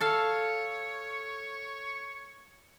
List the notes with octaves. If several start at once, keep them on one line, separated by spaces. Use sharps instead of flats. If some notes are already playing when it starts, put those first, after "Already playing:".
A4 C#5 F5 A5